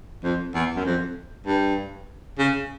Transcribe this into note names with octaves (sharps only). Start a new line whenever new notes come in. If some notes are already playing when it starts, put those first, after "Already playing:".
F2
E2
F#2
F2
G2
C#3